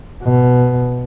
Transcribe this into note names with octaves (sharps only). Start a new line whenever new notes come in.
B2